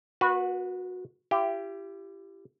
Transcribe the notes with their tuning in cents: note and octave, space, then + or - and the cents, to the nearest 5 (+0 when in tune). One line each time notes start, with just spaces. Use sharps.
A#3 +40 F#4 -20 B4 +0
E4 +40 G4 +0